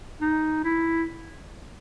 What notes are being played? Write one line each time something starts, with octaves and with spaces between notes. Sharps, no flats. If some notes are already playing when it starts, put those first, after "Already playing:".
D#4
E4